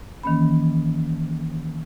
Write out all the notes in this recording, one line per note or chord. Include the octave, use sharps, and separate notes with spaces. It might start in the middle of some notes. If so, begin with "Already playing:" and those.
D#3 E3 A#3 C#4 B5